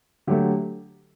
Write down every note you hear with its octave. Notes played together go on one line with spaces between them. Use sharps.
D3 F#3 A3 G4